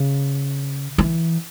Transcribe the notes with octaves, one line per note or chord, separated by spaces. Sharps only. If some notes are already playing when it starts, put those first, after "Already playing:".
Already playing: C#3
E3